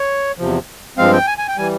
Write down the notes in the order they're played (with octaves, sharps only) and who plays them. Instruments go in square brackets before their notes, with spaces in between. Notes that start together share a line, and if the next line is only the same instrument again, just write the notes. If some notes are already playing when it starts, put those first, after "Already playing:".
Already playing: [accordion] C#5
E2 C3 F3
G2 F3 G#3 C4 F5
G5
G#5
G#5
G5
E3 G3 G#5